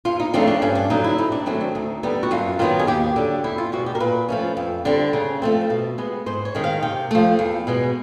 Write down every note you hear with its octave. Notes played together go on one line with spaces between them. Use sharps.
E2 F4
D#4
C#3 F3 A3 C4 D4
D4
G2 C#4
D4
D3 F#3 D#4
E4
C3 D#4
D4
D#3 F#3 A3 C4 C#4
D4
D2 D#4
D3 G3 B3 D#4
F#4
F#2 F4
D#3 F#3 B3 F4
G#4
D#2 G4
D3 F#3
E2 E4
F4
B2 G#3 C4 F#4
G4
A#4
A#2 B4
F3 A3 C#4
F2
D3 G3 C4
C#3
F3 A3 C4
B2
G#3 B3
G#2 C5
C#5
D#3 G#3 C4
F5
C3 G5
F3 A3
E2
B2 G#3 B3